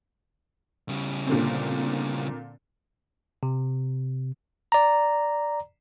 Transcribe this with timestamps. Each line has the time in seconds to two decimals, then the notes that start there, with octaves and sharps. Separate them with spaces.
0.89 C#3 G3
1.27 A#2 D3 C4
3.43 C3
4.72 D5 A#5